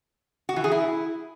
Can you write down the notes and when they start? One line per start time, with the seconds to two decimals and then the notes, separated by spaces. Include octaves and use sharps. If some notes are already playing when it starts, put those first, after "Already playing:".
0.49 F#4
0.56 E3
0.64 G#4
0.72 E4